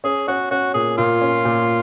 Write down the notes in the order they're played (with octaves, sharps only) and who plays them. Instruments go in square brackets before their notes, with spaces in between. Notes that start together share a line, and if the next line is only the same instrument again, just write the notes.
[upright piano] C#4 [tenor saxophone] G#4
[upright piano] C#4 [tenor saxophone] F#4
[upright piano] C#4 [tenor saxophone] F#4
[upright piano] A#2 [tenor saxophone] G#4
[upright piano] A#2 [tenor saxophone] F4
[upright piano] C#4
A#2